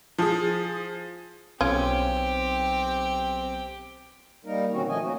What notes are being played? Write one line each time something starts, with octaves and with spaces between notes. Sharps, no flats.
F3 G#4
B1 C4 C#4 F4 G4
G3 A#3 D#4 A#4
B2 D#3 C4 C#4 F#4
F3 A3 D#5 G#5
A#3 C#4 F#4